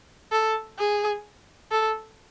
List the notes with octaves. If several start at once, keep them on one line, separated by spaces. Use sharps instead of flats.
A4
G#4
A4